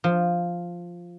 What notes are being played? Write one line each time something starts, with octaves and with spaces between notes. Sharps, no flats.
F3